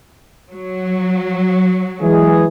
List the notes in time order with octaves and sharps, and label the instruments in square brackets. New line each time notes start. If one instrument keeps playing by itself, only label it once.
[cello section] F#3
[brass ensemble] E3 G#3 G#4